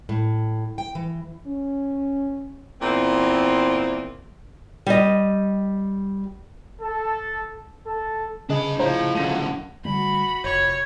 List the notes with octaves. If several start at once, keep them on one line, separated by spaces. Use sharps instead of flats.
A2
G5
E3
C#4
E2 A#2 C4
G3 D#5
A4
A4
C#3 D4 G#4 D#5 B5
A2 F3 C5 A#5
F#2 A2 D3 A#6 D#7
D3 G3 A3 F#4 B5
F1 C#5